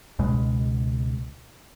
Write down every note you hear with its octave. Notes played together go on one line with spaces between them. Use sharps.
C#2 B2 G#3